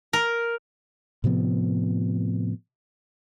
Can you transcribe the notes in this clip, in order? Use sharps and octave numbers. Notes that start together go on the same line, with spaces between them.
A#4
A2 C3 F3 B3